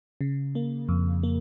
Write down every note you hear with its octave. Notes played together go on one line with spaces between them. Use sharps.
C#3
A#3
F2
A#3